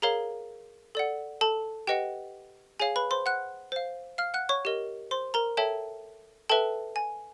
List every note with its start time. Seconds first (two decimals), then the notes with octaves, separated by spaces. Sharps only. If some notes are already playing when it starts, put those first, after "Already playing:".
0.02 G#4 A#4 C#5 F5 A#5
0.95 A4 D5 F#5
1.41 A4 A5
1.87 G4 B4 D#5 F#5 G5
2.80 G#4 C#5 F5 G#5
2.96 B4 B5
3.11 C5 C6
3.26 F#5 F#6
3.72 C5 F5
4.18 F5 F6
4.34 F#5 F#6
4.49 C#5 C#6
4.65 G4 A#4 D#5
5.11 C5 C6
5.34 A#4 A#5
5.57 A4 C#5 E5 G5 A5
6.49 A4 B4 E5 G5 A5
6.96 G#5